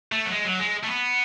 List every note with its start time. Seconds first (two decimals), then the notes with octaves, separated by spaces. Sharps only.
0.12 A3
0.26 F#3
0.31 G#3
0.45 F#3
0.60 G#3
0.84 A3
0.88 B3